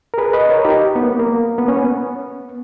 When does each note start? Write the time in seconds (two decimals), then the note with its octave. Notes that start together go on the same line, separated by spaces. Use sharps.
0.14 A#4
0.18 G#4 B4
0.33 B4 D#5
0.49 A#4 C#5
0.65 D#4 G4
0.96 B3
1.03 A#3
1.20 A#3
1.58 B3
1.68 C#4
1.77 B3